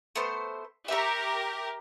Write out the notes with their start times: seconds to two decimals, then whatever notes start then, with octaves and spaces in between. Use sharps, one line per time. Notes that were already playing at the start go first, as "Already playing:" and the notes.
0.16 A3 B3 C5
0.88 G4 A#4 E5 C#6